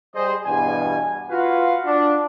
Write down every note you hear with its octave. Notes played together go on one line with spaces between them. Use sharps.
G3 G#4 C5 D#5
E2 G2 B2 G3 G#5
F4 F#4 B4 F5
D4